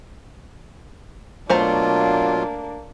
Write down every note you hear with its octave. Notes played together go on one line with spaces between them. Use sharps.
B2 F#3 A3 A#3 D4 F4 C5 A#5